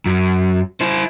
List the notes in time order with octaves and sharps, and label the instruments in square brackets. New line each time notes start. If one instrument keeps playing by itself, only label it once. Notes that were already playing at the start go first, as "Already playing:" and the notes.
[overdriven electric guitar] F#2
E4 C5